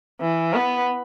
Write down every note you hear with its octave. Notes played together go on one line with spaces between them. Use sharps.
E3
B3